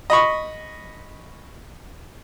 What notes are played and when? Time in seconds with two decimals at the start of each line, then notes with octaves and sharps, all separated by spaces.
0.10 D#5 B5 C#6